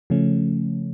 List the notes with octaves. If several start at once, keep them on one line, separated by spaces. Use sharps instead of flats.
C#3 F3 A3 C#4